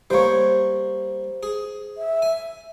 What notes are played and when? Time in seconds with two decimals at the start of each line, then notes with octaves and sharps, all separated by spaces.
0.10 G3 A#3 C5 C#5
1.43 G#4
1.98 E5
2.22 G#5